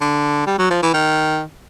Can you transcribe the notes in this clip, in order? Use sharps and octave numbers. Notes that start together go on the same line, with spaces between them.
D3
G3
F#3
F3
E3
D#3